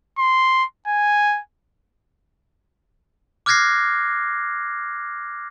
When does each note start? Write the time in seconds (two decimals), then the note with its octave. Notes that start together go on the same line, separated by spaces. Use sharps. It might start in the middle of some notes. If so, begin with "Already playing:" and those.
0.18 C6
0.87 G#5
3.46 D6 F6 F#6 G#6 A#6 C7